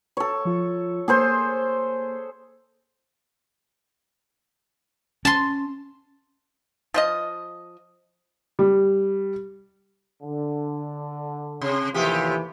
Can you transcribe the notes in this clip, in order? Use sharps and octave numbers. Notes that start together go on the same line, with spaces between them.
A4 C#5
F3 F4
A#3 G#4 A4 C5
C#4 A5 C6
F3 F4 D#5
G3
D3
C3
D#2 A2 C3 E3 F3 G4